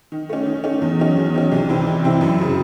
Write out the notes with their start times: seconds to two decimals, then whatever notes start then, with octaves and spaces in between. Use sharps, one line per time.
0.12 D#3
0.29 A3 C#4
0.46 D#3
0.64 A3 C#4
0.82 E2
0.99 D#3 F#3 C#4
1.17 E2
1.34 D#3 F#3 C#4
1.52 C2
1.69 C3 E3 C4 E4
1.86 C2
2.04 C3 E3 C4 E4
2.21 F#2
2.39 C#3 F#3